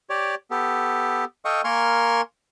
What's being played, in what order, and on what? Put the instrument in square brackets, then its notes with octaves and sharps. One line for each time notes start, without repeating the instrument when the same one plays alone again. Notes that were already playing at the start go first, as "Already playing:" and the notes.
[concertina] G4 C#5 D5
B3 G4 A4
A4 D#5 F5 G5 C#6 D#6
A#3 A#4 G#5 C6 C#6 F6